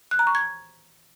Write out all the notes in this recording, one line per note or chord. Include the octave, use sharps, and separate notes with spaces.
F#6
A#5
C#6
G#6